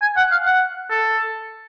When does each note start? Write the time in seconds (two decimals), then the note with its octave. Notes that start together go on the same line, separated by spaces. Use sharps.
0.02 G#5
0.16 F#5
0.32 F5
0.46 F#5
0.90 A4